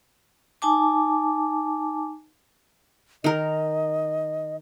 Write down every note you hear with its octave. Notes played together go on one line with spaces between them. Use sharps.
D#4 G#5 A5 D6
D#3 A#4 D#5